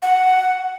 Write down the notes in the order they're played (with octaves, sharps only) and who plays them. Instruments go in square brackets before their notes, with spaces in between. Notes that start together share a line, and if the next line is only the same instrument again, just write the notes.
[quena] F#5